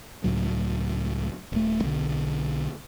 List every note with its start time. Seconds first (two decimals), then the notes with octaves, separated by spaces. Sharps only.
0.24 C#2 A2 F#3
1.52 D#1 A3
1.83 B1 D3